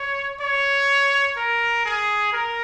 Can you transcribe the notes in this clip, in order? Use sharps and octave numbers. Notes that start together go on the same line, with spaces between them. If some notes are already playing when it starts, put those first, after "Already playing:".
Already playing: C#5
C#5
A#4
G#4
A#4